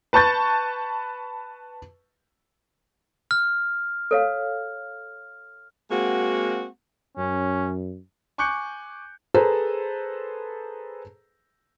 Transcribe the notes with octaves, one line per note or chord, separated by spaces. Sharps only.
B4 A5 C#6 G6 A6
F6
A4 C#5 F5
G#3 A#3 C4 F#4
F#2 C#4
G#5 C#6 D6 F#6 G6 C#7
G#4 A4 B4 C5 A#5